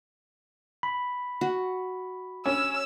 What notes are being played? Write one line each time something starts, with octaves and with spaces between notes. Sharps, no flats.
B5
F#4
C#4 E6